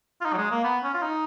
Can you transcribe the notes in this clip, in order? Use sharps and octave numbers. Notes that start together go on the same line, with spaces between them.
F4
D#4
F#3
G#3
A#3
B3
C#4
F4
D#4